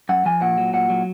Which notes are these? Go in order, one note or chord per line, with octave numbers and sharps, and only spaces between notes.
F#2 F#5
F3 G#5
A#2 F#5
F#3
A#2 F#5
F#3